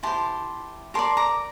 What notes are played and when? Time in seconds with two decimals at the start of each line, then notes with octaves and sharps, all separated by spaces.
0.03 E4 G4 C5 A5 C6
0.94 G4 A#4 D5 A5 C6
1.17 A#5 D6